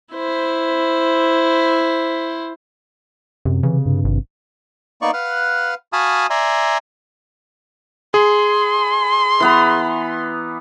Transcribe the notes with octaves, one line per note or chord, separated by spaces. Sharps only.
E4 C5
F#2 C3
C#3 E3
G2
G#1
A#3 B3 D#4 D5 C#6
B4 F5 F#5
F#4 F5 G#5 A5 B5 D#6
D5 E5 G#5 A#5 C6
G#4 C6
E3 B3 A#5